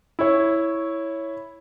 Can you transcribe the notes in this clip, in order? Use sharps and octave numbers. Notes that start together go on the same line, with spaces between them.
E4 C#5